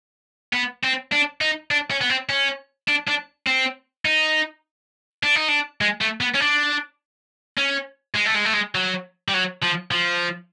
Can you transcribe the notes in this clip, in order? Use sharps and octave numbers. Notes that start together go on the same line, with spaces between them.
B3
C4
D4
D#4
D4
C#4
B3
C4
C#4
D4
D4
C4
D#4
D4
D#4
D4
G#3
A3
B3
C#4
D4
C#4
G#3
A3
G#3
A3
G#3
F#3
G3
F#3
F3
F3